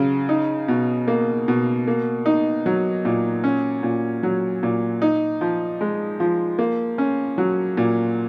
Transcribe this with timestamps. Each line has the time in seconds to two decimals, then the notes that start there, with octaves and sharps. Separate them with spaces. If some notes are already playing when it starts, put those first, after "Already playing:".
Already playing: C#3 F#3
0.29 D#4
0.68 B2
1.08 A#3
1.48 B2
1.87 A#3
2.26 D#4
2.66 F#3
3.05 A#2
3.44 C#4
3.83 A#2
4.23 F#3
4.63 A#2
5.02 D#4
5.41 F3
5.81 G#3
6.20 F3
6.58 A#3
6.98 C#4
7.38 F#3
7.77 A#2